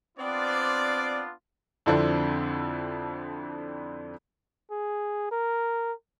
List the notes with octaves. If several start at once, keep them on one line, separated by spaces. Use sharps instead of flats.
B3 C4 D4 F4 D5
F2 D3 F3 C4 D4 E4
G#4
A#4